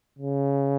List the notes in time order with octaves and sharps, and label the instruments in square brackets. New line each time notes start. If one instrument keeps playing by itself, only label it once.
[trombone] C#3